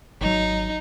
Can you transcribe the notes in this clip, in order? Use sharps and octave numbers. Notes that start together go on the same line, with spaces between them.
G#1 F#3 D#4